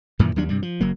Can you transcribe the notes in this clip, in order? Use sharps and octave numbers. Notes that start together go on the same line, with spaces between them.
F#2 A#2 D#3 E3
D#2 F#3 G3 D4
G2 C3 G3
F3
F#1 F#3 A#3